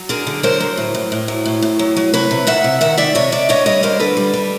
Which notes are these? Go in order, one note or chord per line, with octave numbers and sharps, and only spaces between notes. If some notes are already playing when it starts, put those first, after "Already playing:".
Already playing: F#3
D3 G#4 A#4
D3
F#3 A#4 C5
F#3
A2
A2
A2
F#3
A2
A2
F#3
F#3
C3 B4 C#5
C3
D#3 E5 F#5
C3
D#3 E5 F#5
D#3 D5 E5
C3 C#5 D#5
C3 D5 E5
D3 C#5 D#5
G3 C#5 D#5
D3 A#4 C5
D3 A4 B4
G3
G3